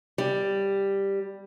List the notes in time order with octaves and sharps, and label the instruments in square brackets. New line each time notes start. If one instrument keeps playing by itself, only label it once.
[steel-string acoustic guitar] G3